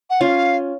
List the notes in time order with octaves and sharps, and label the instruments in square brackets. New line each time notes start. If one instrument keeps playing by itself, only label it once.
[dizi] F#5
[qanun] C#4 F4 [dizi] F5